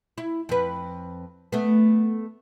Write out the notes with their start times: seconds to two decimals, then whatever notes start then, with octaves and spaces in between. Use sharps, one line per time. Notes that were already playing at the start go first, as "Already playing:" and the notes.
0.18 E4
0.49 F2 B4
1.52 A3 B3